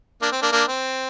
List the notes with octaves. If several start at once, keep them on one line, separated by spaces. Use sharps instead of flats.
A#3 D4
C4
A#3 D4
A#3 D4
C4